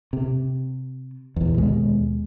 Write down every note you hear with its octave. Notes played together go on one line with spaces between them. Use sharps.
C3
A#1 E2
D#2 B2 G#3